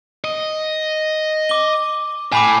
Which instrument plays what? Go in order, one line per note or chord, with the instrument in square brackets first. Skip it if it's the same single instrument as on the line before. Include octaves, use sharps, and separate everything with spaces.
[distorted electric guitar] D#5
[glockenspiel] D6 G7
[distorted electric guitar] A2 [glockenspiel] G#5 B5 D6